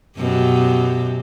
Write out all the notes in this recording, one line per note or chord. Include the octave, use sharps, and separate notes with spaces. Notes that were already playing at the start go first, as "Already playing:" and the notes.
F#2 B2 G4